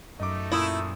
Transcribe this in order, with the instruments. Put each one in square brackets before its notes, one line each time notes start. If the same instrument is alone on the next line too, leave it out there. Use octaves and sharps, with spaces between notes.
[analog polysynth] F#2 [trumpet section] A3 D#4 [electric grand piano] D#5 D6
[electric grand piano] A#2 D#6 [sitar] E4